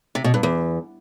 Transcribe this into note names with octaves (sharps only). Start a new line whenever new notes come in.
C3
B2
G2
E2